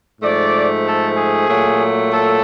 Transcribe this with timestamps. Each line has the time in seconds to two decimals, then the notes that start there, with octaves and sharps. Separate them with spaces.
0.22 G#2 F3 A3 D5
0.86 A4
1.17 G#4
1.49 A#2 F#3 A3
2.12 A4